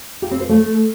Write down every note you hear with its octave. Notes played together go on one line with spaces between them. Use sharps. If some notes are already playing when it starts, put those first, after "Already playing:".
G4
C4
C5
A3